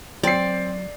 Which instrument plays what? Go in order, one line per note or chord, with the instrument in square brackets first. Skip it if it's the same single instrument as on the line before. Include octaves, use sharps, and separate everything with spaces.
[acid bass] F#3 [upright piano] C4 C7 [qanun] D5